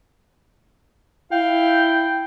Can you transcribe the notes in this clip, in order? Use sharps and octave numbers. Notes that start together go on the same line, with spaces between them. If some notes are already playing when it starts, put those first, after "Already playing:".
E4 F5 G5